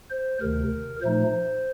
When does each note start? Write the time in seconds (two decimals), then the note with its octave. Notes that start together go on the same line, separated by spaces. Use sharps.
0.11 C5
0.41 D2 C3 D#3 A#4
1.02 A#2 F3 A3 D#4 C5